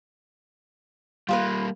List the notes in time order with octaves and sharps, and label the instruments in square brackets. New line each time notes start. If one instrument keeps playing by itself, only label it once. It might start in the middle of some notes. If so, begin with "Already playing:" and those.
[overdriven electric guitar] G3 A#3 [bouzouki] F4 G#4 B4